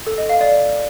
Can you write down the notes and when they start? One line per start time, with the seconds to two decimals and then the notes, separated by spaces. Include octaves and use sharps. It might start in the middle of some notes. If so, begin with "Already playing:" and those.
0.07 A4
0.18 D#5
0.29 F5
0.41 D5